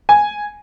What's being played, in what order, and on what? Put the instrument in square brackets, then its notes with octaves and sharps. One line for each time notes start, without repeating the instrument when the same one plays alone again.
[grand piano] G#5